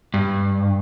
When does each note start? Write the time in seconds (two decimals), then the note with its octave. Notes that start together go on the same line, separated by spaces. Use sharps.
0.14 G2